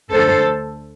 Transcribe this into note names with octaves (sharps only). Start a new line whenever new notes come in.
D2 D3 A4 C5